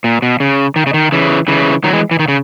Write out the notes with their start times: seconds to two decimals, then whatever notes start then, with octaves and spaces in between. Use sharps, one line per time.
0.04 A#2
0.22 B2
0.40 C#3
0.76 D#3
0.87 C#3
0.94 D#3
1.12 C#3 E3
1.48 C#3 E3
1.84 D#3 F#3
1.93 E3 G#3
2.11 E3
2.19 D#3
2.28 C#3